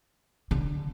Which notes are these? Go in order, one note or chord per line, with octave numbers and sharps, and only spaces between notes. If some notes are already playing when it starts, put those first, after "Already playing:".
D3